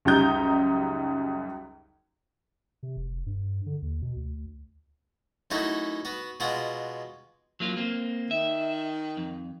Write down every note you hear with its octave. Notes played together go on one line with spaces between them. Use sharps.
C#2 F#2 G3 D#4 A#5 G6
C3
F1
G2
D3
D#2
B2
D2
F#2 A3 D#4 E4 F#4 D#5
B3 F#4
B2 G#3 F4 F#4 F#5
F#3 A#3 F4
A#3 C4
D#3 E5
F2